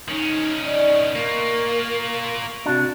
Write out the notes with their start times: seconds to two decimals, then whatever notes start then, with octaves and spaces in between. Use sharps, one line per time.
0.09 D#3 C#4 D#4
0.65 D5 D#5
1.15 A#3 F4 A#4 C#6
2.66 C3 D4 F#4